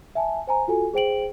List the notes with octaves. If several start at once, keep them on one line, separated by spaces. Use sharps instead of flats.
E5 G#5 A5
C5 G#5 A#5
F4 F#4 A4 G#5
G#4 C5 G5 D7 F#7